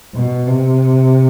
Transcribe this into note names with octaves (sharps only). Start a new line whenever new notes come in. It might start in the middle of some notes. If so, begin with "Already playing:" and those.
B2
C3